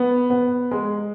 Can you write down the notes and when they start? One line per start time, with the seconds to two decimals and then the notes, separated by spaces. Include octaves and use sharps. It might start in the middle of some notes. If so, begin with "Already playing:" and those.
Already playing: B3
0.30 B3
0.71 G#3